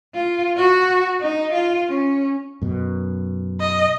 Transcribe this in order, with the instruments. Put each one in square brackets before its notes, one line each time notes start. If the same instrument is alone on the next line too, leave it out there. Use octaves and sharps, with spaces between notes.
[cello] F4
F#4
D#4
F4
C#4
[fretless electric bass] F#2 B2
[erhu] D#5